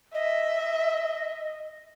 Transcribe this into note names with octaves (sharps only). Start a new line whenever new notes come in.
D#5 E5